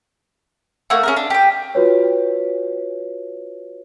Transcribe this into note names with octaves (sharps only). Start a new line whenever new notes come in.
A3 A#3 F#4
C#4 G#4 A#4
D4
G4 G5
F4 F#4 B4 C#5